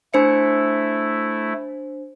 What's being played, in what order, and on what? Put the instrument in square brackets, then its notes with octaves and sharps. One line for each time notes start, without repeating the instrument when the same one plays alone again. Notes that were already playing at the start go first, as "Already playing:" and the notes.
[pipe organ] A3 E4 [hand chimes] D4 C5 C#7